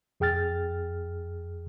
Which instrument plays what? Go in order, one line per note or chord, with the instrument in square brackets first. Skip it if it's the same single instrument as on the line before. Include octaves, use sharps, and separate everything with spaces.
[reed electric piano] F2 G#4 G5 F6 A6